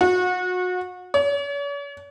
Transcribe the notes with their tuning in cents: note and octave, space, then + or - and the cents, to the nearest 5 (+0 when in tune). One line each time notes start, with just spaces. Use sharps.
F#4 -30
C#5 +45